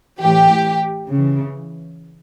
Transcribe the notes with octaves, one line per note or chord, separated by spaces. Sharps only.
A2 E3 G4
C#3 E3